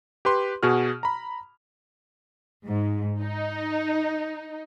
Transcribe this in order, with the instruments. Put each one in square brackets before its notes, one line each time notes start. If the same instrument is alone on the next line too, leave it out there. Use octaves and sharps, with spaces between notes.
[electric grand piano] G4 B4 C6
B2 F#4 G#4 F6
A#5 B5
[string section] G#2
D#4